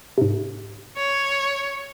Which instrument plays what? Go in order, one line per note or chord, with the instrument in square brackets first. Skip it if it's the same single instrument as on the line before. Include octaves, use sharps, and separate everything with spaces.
[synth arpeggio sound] G#2 C3
[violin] C#5